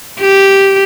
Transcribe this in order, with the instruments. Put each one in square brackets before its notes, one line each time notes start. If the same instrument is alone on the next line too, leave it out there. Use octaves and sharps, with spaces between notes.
[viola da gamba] G4